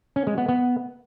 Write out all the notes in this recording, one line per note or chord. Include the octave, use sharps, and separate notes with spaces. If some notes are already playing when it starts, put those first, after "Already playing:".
C#4
G#3
B3
B3